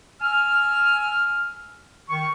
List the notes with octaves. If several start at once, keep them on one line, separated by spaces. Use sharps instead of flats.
G#5 E6 F6
D#3 C#6